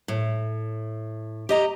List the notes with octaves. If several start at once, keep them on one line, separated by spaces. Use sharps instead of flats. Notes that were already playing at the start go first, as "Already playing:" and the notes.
A2
G4 D#5 A#5